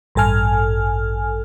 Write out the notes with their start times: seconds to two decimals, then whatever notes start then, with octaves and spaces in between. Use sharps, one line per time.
0.15 A1 G2 A4 G#5 F6